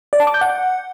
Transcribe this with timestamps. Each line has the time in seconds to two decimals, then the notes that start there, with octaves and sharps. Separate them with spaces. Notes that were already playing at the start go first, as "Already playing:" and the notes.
0.13 D5
0.20 A5
0.27 D6
0.34 G6
0.41 F#5